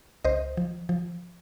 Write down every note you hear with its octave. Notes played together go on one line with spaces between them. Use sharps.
C#2 C5 D#5
F3
F3